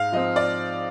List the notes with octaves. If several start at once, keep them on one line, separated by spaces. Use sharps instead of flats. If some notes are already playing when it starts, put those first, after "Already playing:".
Already playing: G#2 F5
F3 C4 D#5
D5